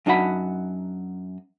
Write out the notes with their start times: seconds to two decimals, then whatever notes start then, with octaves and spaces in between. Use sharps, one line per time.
0.06 F#2 D4 D#4 F#4 F#5 B5